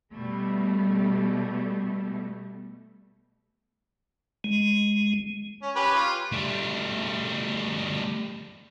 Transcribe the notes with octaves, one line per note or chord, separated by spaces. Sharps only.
B2 G3 A3
G#3
C#4
C#4 G4 B4
F4
G3 A3